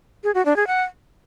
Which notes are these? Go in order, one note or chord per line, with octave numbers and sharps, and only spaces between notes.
G#4
F#4
D4
G#4
F#5